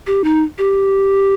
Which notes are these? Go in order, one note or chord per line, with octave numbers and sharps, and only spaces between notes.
G4
D#4
G4